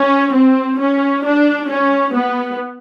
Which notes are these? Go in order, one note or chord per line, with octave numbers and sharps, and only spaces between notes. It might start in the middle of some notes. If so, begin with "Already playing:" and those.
Already playing: C#4
C4
C#4
D4
C#4
B3